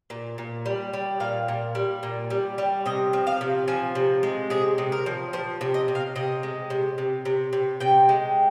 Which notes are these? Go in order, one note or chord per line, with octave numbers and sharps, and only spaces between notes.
A#2
A#2
G3
G3
A#2 F5
A#2
G3
A#2
G3
G3
C3 D#5
F3
F5
C3
F3 G#5
C3
G#3
C3 G#4
C3
A#4
F3
F3 C5
C3
D#5
C3
F5
C3 D#5
G#3
C3
C3
C3
C3
C3 G5
G#3